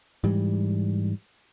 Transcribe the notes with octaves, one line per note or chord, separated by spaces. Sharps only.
G#2 E3 G3